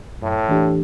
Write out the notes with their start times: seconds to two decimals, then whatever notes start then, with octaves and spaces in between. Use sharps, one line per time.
0.22 F#2 A2
0.48 E3 A3 D4 G4